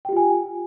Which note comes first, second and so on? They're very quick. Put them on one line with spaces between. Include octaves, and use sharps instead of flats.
G5 G4 F4 G#5